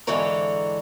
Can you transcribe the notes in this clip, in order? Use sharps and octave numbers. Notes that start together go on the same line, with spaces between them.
G#2 D3 E3 A4 C#5 A#5